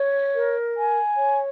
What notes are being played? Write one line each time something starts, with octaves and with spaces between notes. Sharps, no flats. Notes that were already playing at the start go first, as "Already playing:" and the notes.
Already playing: C#5
A#4
G#5
C#5